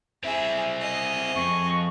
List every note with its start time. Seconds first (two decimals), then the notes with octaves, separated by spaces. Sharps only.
0.23 C4 E4 G#4 E5
0.81 G#4 D#5
1.35 F2 C#6